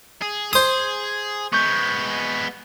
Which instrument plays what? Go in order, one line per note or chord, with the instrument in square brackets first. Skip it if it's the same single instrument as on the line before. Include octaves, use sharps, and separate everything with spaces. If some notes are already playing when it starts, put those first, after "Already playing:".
[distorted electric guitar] G#4
[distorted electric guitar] G#4 [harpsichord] C5 D#6
[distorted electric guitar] G#3 B3 [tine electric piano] C#6 G6